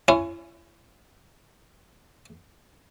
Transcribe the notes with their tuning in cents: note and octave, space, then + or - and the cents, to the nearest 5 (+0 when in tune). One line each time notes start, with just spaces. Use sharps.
C#4 +0 E4 +35